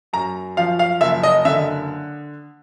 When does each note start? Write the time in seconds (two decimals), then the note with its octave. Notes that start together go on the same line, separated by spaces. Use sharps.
0.13 F#2 A#5
0.57 F3 F5
0.79 F5
1.01 F#1 E5
1.23 D#5
1.45 D3 E5